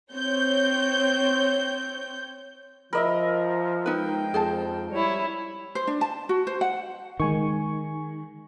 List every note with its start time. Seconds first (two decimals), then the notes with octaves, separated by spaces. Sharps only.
0.14 C4 C#5 G6
2.93 F3 A#4 D#5 E5 B5
3.86 G#3 D#4 B4 G5
4.34 F2 G#4 C5 A5
4.91 G3 E4 C#5
5.75 C5
5.87 D4
6.01 A5
6.29 F#4
6.47 C5
6.61 F#5
7.20 D#3 G#3 G#5 C#6